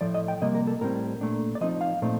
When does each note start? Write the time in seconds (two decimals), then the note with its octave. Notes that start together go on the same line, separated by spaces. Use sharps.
0.01 A2 F3 A3 D5
0.15 D#5
0.28 G5
0.41 C3 G3 A#3 D#5
0.55 A#4
0.67 A4
0.81 A2 G3 C4 A#4
1.21 A#2 A3 D4
1.55 D5
1.61 F3 C4 D#4 D#5
1.81 F5
2.02 A#2 A3 C4 D#4